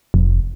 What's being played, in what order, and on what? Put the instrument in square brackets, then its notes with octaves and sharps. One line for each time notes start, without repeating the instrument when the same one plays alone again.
[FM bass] F1